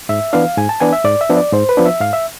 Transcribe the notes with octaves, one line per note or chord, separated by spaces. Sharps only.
G#2 E5
E3 B3 D4 F5
G#2 G#5
A5
E3 B3 D4 G#5
E5
G#2 D5
E5
F3 B3 D4
D5
G#2 C5
B4
F3 B3 D4
E5
G#2 F5
E5